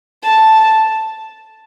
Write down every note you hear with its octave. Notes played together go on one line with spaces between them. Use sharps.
A5